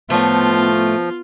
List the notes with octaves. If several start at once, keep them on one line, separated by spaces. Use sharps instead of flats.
A2 F3 A3 B3 F4